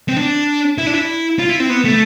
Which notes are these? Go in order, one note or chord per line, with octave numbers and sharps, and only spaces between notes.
C4
D4
E4
D4
E4
F4
E4
C4
B3
A3